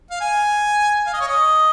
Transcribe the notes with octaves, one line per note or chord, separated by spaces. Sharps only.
F5
G#5
F5
D#5
C#5
D#5